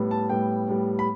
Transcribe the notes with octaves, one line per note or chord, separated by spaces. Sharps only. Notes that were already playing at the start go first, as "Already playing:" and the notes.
Already playing: A2 G3 B3
A5
A2 G3 B3 G5
A2 G3 B3
B5